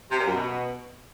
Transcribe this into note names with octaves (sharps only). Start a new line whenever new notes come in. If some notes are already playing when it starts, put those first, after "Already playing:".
C3
A#2
F#2
B2